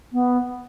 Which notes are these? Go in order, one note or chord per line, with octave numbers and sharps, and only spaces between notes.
B3